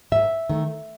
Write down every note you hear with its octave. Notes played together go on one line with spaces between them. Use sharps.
G#2 E5
D#3 A3